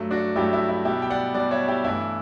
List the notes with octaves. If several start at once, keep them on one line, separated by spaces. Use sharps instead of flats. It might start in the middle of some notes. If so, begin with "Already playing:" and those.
Already playing: G2 F#3 A3
D4 F#4
G2 F#3 A3 E4 G4
E4
E4
B2 G3 E4 G4
G5
D5 F#5
B2 G3 D5 F#5
C#5 E5
E4 G4
G2 E3 A3 E4